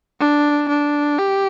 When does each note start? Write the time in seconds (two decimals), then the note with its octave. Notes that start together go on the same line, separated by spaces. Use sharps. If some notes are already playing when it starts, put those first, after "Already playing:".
0.20 D4
0.69 D4
1.19 G4